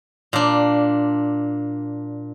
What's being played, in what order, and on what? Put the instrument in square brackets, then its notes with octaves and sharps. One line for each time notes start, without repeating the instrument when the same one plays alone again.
[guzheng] A#2 D4